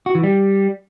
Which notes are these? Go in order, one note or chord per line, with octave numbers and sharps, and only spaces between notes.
F#4
E3
G3